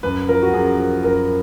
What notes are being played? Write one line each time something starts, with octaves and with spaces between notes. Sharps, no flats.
F#2 B4
F3 A#4
F#4
F#2 G#4
F3
F#2 A#4